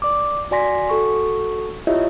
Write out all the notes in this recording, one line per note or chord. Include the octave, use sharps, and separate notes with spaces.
D5 D6
F#4 D5 G#5 C6 A#6 B6
F#4 A4 C#6
E4 F4 G4 C#5 D#5 E5